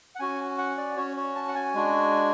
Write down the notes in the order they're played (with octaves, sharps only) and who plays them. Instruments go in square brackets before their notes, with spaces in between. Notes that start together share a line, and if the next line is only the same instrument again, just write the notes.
[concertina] F#5
C#4 F#4 G#5
F#5
D5
C#4 F#4 C#5
C#5
A5
F#5
G#5
G#3 D4 F#4